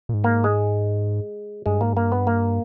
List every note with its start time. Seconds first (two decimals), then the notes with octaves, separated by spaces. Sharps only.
0.09 A#2
0.14 G#2
0.24 A#3
0.44 G#3
1.66 G2 G#3
1.79 G#2 A#3
1.93 G2 A#3
2.12 B3
2.27 A#3